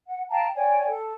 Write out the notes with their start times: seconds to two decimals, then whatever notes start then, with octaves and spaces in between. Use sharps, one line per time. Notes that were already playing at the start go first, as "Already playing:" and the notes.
0.07 F#5
0.30 F5 G5 A5 A#5
0.55 C#5 D5 G5 G#5
0.88 A4